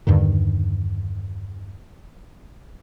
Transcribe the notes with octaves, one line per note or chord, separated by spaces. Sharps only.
E2 G2 D3 D#3